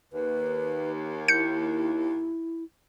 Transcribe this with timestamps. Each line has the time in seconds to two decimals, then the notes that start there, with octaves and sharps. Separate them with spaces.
0.13 D#2 B4
1.28 E4 G6 C#7